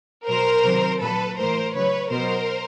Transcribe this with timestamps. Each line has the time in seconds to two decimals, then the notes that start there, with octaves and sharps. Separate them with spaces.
0.27 B2 F#3 A#4 C5
0.64 C3 D#3 F#3
1.01 A#2 F#3 A4 B4
1.38 A2 E3 A#4 C5
1.74 C#3 F#3 B4 C#5
2.11 B2 F#3 A#4 C5